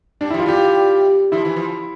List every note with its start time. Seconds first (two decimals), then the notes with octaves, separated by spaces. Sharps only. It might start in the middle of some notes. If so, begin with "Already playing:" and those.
0.21 G3 D4
0.30 E4
0.34 F3
0.39 F4
0.46 G3 G4
1.32 F3 E4
1.45 E3
1.56 F3